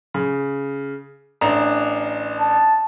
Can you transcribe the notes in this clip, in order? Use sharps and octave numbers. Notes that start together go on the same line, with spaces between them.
C#3
A1 D4 A#5
A5